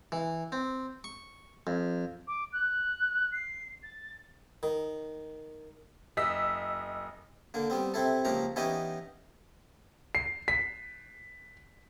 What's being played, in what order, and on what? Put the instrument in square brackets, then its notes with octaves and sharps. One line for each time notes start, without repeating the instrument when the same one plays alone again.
[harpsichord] E3
C4
C#6
F2
[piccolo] D6
F#6
C7
A6
[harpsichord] D#3
[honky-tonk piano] F#1 D#5 E6 B6
[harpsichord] D3 A#3
G3 B3 C4
C3 C4 E4 A4
C#2 F3 A#3 G4 A#5
E3 B3 C#4 D#4 G4 D#5
[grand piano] C7
B6